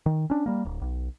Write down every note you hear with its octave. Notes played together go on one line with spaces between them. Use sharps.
D#3
C#4 D4
G3 A#3
D1
B1